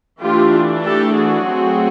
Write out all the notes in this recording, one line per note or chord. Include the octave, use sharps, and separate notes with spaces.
E3 A3 D4 F4 G4
G4 A4
F#4 G#4
F#3 A3 C4